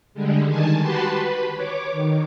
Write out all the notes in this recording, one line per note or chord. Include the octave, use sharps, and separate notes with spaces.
D3 G3 G#3
D#3 G#5 A5
F#4 G4 B4 A5 B5 C6
B4
C#5 D6
D#3